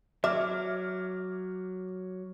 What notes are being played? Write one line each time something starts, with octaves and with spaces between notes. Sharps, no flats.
F#3 E5 D6 F6